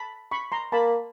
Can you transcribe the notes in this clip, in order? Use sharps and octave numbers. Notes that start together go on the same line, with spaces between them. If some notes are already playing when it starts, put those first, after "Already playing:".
Already playing: A5 B5
B5 C#6
A#5 C6
A#3 A5 B5